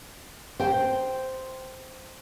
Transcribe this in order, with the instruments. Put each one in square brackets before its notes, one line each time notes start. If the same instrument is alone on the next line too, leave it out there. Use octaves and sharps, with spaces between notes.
[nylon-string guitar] C5 G5